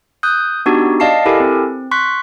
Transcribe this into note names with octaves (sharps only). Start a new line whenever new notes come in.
D#6 F#6 G6
B3 D4 D#4 F#4 G4
D5 D#5 F5 A5 C7
E4 G4 A4 A#4 G#5
C4
C6 C#6 F#6 B6